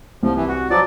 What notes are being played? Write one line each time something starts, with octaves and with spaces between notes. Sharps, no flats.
C2 F3
E3
F#4
F3 F#3 F#4 D5